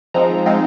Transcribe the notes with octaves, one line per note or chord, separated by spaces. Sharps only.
F3 G#3 C4 D#4 A#5
F3 G#3 C4 D#4